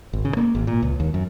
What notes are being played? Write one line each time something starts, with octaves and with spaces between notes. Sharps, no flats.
G#1
C#3
A#3
G#1
A#2
C#2
D#2
F#2